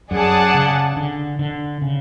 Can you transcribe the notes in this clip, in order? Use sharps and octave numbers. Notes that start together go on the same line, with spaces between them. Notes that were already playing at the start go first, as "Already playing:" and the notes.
F#2 G#4 D5 F#5 A5
C#3
D3
D3
C#3